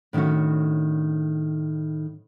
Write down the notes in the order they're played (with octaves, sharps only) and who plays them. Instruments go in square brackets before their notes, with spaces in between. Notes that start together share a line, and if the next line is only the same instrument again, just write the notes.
[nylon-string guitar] A2 D#3 C#4 D4 F#4